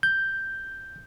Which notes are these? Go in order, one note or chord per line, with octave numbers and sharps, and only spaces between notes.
G6